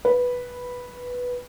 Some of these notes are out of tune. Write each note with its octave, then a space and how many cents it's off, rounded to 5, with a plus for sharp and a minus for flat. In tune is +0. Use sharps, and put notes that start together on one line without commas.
B4 -5